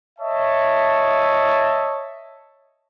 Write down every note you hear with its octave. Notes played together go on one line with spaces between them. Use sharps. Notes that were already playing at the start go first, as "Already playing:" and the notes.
C#5 D#5 E5 A5